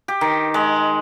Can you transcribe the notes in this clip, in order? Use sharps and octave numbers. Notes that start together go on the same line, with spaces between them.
G4
D#3
G#3